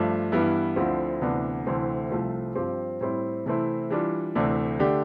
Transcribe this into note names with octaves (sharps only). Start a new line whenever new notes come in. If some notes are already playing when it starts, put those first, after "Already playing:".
Already playing: G2 F3 A3 D4
G2 E3 G3 B3 E4
D2 D3 F3 C4 E4
D2 C3 E3 B3 D4
D2 C3 E3 A3 C4
C2 C3 F3 A3 C4
G2 F3 C4 G4
A2 G3 C4 E4
C3 E3 A3 C4 E4
E3 G3 D4 F4
D2 C3 E3 A3 D4
D3 A3 D4 G4